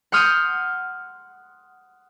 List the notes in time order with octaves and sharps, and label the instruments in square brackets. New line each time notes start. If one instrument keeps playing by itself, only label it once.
[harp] F#5 C6 D#6 F6 G6 D#7